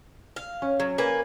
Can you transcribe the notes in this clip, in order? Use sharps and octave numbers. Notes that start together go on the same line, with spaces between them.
F5
C#4
F#3
A#3 B4 G#5